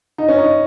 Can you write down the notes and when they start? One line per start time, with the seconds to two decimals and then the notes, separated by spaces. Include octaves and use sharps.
0.18 D#4
0.29 C#4
0.38 D#4